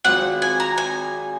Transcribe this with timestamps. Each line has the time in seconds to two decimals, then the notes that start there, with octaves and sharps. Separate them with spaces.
0.05 G#1 G#2 F#3 C4 F4 F#5
0.42 G#5
0.60 A#5
0.78 G#5